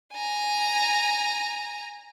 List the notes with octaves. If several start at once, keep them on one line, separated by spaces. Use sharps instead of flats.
G#5 A#5